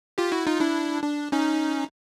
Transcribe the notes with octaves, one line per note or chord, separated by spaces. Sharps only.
F4 G4
E4 F#4
D#4 F4
D4 E4
D4
C#4 D#4